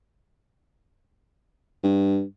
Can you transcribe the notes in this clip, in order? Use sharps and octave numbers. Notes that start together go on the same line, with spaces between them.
G2